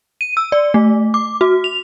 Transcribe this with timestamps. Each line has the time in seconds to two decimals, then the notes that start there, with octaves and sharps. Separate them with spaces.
0.21 D#7
0.37 E6
0.52 D5
0.74 A3
1.14 D6
1.41 F#4
1.64 F7